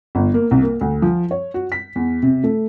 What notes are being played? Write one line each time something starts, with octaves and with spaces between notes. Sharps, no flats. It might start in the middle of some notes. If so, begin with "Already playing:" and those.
G1
A#3
C2
A#3
D2
F3
C#5
F#4
B6
E2
C3
A3